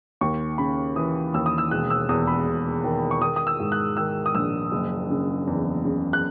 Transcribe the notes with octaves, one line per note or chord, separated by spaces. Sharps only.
D#2 C#6
C#3 B5
E3 D#6
D#2 E6
D#6
E6
E1 F#6
E6
E2 D#6
B5
E1
D#3
C#6
D#3 D#6
D#6
E6
G#2
F#6
D#3 E6
D#6
A#1 E6
F#1
C#3
E2
C#3
F#6